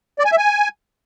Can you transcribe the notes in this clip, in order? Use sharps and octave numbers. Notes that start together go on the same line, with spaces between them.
D5
G#5
E5
G#5